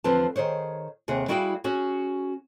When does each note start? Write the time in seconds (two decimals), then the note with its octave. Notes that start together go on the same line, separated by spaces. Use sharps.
0.04 E2 D3 F3 C4 B4 A5
0.36 D#3 G#4 C5 C#5
1.08 D#2 C3 G#4 F#5
1.28 G3 E4 F#4 G#4 F5 G5
1.64 C#4 F#4 G#4